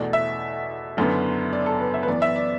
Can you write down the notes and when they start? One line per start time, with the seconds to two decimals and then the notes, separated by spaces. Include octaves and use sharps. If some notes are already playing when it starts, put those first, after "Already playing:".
Already playing: E2 B2 A3 D5
0.13 E5
0.97 F#1 F#2 D3 B3
1.53 D5
1.66 A4
1.80 B4
1.94 E5
2.03 B4
2.08 F#2 E3 B3 D5
2.22 E5
2.36 D5